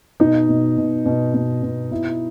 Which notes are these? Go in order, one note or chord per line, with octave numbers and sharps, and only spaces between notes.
B2 D#4
B2
B2
B2
B2
B2
B2 E4